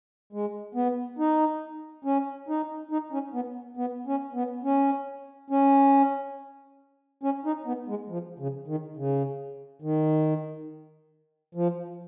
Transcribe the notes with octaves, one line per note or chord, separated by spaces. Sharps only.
G#3
B3
D#4
C#4
D#4
D#4
C#4
B3
B3
C#4
B3
C#4
C#4
C#4
D#4
B3
G#3
F3
C#3
D#3
C#3
D#3
F3